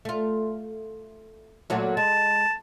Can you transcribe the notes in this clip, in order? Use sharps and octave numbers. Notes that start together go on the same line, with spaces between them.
A3 F4
A#2 F#3 A3
G#3 A5